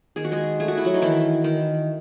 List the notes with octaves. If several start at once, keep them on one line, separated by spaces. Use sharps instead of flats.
D#3 G#4
F#4
G#3 G#4
A3 G#4
F#4
E4
F#3 F#4
D#4
D#3 E3 E4
D#3